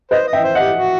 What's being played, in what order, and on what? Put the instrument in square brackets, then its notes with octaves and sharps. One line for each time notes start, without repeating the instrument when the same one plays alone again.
[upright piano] B4 D#5 [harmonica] C5
[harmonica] D#5
[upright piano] E5 G5
[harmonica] C5
[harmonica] G4 [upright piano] D#5 F#5
[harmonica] F#4